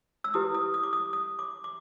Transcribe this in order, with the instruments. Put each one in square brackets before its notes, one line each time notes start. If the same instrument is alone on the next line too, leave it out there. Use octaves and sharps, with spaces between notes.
[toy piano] E6
E4 G4 B4 D#6
D#6
D#6
D6
D#6
D#6
D6
D6